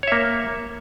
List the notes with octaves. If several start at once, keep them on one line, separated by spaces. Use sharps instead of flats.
A#3 C#5 E5